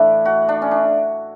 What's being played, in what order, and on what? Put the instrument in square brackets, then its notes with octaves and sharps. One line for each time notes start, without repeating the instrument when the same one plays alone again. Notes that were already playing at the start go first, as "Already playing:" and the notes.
Already playing: [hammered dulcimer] A2 E3 A3 D4 E4
F#4
D4
C#4
D4